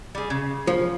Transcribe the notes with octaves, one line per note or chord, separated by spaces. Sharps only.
G3 G#4
C#3
F3